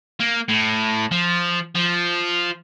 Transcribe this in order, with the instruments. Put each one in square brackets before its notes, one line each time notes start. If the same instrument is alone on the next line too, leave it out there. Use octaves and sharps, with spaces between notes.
[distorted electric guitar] A#3
A2
F3
F3